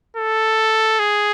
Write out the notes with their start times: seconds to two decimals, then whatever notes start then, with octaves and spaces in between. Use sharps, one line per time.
0.17 A4
0.99 G#4